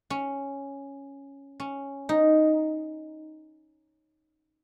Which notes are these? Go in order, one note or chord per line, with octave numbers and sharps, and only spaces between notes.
C#4
C#4
D#4